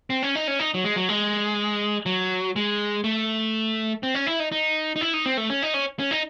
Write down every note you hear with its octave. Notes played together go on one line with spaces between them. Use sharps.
C4
C#4
D#4
C#4
D#4
F#3
G#3
F#3
G#3
F#3
G#3
A3
C4
C#4
E4
D#4
D#4
D#4
E4
D#4
C4
A3
C#4
D#4
C#4
C#4
D#4